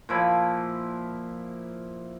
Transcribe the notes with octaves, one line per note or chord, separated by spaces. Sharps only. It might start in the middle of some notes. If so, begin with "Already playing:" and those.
A#2 F3 E4 B5